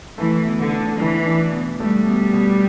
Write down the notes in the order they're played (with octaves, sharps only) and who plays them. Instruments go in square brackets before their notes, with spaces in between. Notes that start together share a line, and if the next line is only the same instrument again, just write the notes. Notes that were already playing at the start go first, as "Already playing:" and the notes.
[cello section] E3 [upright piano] A3
[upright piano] B2
[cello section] D3
[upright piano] D4
[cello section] E3 [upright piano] A3
[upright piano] D4
B2
[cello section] G3 [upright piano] A3
[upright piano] B2
B2